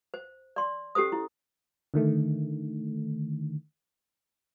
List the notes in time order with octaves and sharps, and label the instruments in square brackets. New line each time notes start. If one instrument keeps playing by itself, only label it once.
[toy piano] C5
D5 C6
C#4 G4 A4 C5 D#6
E4
[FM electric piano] D3 D#3 A3